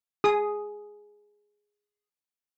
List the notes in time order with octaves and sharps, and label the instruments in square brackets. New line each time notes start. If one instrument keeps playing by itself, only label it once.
[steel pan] G#4 D#6